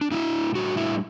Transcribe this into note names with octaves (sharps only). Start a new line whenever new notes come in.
D4
A2 G3 D4 E4
A2 G3 D4 F#4
E4